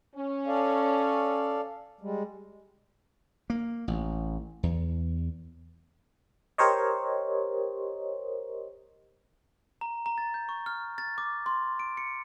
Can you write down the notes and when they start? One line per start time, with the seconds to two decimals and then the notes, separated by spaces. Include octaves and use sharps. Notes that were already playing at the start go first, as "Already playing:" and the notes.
0.15 C#4
0.47 A4 D5 F5
2.01 G3 G#3
3.50 A#3
3.88 A1
4.63 E2
6.58 G4 A#4 C5 C#5 D#5
9.81 A#5
10.06 A#5
10.18 A6
10.34 G6
10.49 C#6
10.66 F6
10.98 A6
11.18 D6
11.46 C6
11.80 D7
11.97 C#7